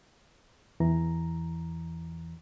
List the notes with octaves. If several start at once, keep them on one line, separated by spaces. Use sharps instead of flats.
E2 E3 A#5